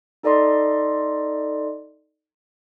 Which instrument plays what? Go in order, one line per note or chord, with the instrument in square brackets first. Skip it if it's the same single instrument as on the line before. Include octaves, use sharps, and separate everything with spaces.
[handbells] D#4 A4 D5 D#5 C6